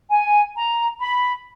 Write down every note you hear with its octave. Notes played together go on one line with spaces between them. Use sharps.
G#5
A#5
B5